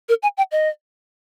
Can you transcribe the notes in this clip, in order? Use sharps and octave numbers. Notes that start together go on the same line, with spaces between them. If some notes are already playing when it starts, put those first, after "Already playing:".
A#4
G#5
G5
D#5